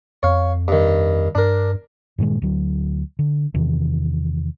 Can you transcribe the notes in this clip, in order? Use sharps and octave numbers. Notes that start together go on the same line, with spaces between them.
F2 C#5 F5
G2 D#3
G2 D4 A#4
G2 A#2 D#3 G#3
D2 F#3
D3
E2 C3 D#3 E3